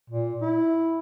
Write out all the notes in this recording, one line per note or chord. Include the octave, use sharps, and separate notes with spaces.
A#2
E4